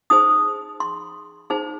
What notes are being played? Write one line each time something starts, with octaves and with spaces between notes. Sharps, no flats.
D#4 G#4 C5 D#6
C6
D#4 G#4 C5